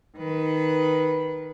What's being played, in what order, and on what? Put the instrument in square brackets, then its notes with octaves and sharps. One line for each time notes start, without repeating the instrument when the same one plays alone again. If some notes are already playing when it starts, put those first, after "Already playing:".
[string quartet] D#3 B4